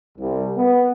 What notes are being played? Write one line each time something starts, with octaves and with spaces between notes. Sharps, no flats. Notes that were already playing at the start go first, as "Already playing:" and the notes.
C2
B3